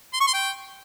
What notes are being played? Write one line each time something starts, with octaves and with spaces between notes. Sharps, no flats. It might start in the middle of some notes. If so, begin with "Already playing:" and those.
C6
C#6
C6
G5